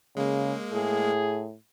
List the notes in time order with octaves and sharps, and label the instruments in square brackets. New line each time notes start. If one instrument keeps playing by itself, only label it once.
[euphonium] C#3 [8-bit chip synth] G#3 A#3
[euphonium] A2 [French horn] G#4